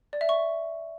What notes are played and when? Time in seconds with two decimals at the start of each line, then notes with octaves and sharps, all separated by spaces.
0.13 D5
0.21 E5
0.29 C#6